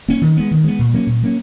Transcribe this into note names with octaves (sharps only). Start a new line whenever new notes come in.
A#3 C#4
D#3
G#3 B3
D#3
G#3 B3
A#2
F#3 A#3 C#4
A#2
F#3 A#3 C#4